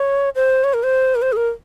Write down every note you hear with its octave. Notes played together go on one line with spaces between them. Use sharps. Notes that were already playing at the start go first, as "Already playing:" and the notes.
Already playing: C#5
C5
C#5
A#4
C5
A#4
C5
G#4
A#4